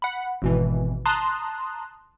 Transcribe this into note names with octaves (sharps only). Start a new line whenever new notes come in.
F#5 B5
G#1 B2 E3
A5 A#5 C6 D#6 F#6